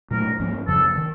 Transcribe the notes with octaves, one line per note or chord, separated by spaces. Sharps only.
A#2 F#3 A3 A#4
G#2 F3 A#3 C#4
F2 C#3 F3 A4
D#3